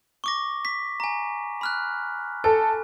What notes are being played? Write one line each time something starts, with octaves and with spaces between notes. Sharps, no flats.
C#6 D6 A#6
B6
G#5 A#5
B5 F6 F#6
A4 G#5